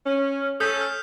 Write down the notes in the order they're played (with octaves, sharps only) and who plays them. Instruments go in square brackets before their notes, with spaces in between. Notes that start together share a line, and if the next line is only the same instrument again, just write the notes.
[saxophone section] C#4
[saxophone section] C#4 A4 [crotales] D#6 G6 B6
[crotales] F6